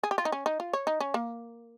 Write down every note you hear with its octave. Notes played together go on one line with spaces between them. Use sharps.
G#4
G4
F4
D#4
C#4
D#4
F4
C#5
D#4
C#4
A#3